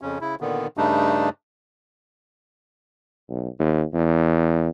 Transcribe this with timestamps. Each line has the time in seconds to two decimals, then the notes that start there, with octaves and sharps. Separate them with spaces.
0.01 F2 C#3 C#4
0.21 C#3 E4
0.41 A#2 D3 D#3 B3
0.77 G2 C#3 G3 A3 D4 D#4
3.29 B1
3.59 D#2
3.93 E2